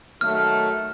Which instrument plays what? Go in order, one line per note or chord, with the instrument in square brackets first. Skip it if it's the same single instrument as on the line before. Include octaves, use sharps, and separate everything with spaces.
[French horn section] D#3 F#3 A3 [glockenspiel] F6